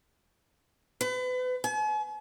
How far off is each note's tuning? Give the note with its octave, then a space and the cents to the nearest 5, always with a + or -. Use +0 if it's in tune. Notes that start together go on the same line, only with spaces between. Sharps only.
B4 +35
G#5 +45